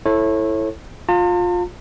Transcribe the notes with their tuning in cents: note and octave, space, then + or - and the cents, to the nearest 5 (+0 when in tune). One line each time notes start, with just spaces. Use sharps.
E4 +0 A4 +0 C#5 -30
F4 +20 A5 +45